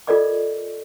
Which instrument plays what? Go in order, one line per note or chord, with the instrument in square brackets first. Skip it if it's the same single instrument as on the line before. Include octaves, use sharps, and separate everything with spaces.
[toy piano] F4 A4 A#4 D5 D#5 D6